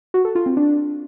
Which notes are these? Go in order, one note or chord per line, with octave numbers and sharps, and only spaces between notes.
F#4
A4
F4
C4
D4